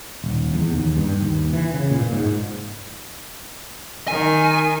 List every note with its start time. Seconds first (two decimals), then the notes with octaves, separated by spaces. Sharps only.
0.24 D#1
0.54 E2
0.72 D#2
0.97 G2
1.21 D#2
1.53 E3
1.74 C#3
1.91 A#2
2.13 G#2
4.08 D#3 G#5